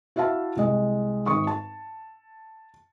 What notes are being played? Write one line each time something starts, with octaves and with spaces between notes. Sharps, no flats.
E4 F#4 E5 F5 A5
C2 G#3 D#5
G#1 C#6 D#6
A5